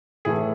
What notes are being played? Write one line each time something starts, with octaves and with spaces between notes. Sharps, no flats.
A2 E3 A3 G#4